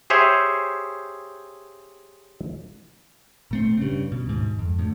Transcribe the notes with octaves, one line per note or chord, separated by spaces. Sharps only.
G4 G#4 C5 C#5 E5
A#2 A3 C4
G2 C#3
B2
D#2 G#2
F2
D2 A2